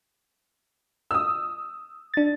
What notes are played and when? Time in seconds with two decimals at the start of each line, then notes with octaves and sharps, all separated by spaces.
1.11 D#6 E6
2.14 D4 A6